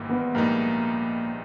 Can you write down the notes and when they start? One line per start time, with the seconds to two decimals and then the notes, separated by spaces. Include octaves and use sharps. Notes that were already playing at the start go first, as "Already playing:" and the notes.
Already playing: G#1 G#2 E3 G3 A#3
0.09 B3
0.35 A#1 G#2 G3 A#3 B3 D#4